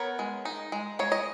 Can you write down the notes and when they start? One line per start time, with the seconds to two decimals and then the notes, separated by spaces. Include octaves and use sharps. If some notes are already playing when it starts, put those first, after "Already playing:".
Already playing: B3 A#4 C#5
0.19 G#3
0.45 D#4
0.72 G#3
0.99 G#3 C#5
1.12 D#5